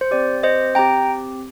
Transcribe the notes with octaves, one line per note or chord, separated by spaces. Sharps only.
C5
C4 G4 D5
C5 D#5
C4 G4 G5 A#5